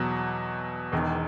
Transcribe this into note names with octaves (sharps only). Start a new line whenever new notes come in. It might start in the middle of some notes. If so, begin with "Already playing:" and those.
Already playing: E2 B2 F#3
E1 E2 D#3